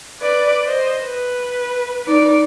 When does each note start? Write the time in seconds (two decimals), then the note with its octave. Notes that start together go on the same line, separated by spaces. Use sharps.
0.21 B4 D5
0.66 C5 D#5
1.03 B4
2.06 D#4 D5